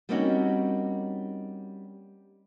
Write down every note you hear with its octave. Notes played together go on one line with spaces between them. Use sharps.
G3 A#3 C4 C#4 D#4 F#4